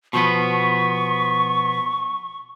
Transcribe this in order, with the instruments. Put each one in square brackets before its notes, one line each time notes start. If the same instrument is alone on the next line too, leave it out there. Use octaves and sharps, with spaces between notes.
[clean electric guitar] B2 F3 B3 [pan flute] C#6